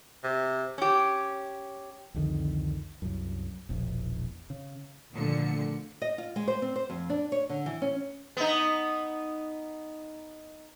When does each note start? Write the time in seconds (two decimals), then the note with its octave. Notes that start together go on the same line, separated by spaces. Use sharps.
0.24 C3
0.78 C#4 G4
2.14 C2 F2 D3 D#3
3.02 C2 F#2
3.69 E1 A#1
4.50 C#3
5.12 G#1 D2 A#2 D3 F3 C#7
6.02 D#5
6.18 F4
6.36 G#3
6.47 C5
6.62 C4
6.76 C5
6.90 F2
7.10 D4
7.32 C#5
7.49 D3
7.66 E3
7.82 C#4
8.37 B3 D#4